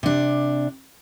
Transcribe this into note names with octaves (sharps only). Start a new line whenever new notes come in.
C3 D4